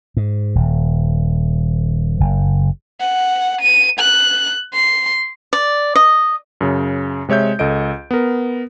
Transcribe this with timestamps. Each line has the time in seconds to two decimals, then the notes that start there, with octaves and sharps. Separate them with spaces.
0.17 G#2
0.55 D#1
2.20 F#1
3.00 F#5
3.61 D#7
3.99 F#6
4.73 C6
5.53 D5
5.95 D#5
6.61 F#2 C#3
7.28 C3 G#3 C#5 E5 G6
7.59 C#2 A4 D#5 D7
8.11 B3 A#4